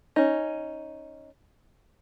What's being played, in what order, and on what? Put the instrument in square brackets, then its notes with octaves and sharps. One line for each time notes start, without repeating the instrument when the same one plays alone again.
[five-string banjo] C#4 D#4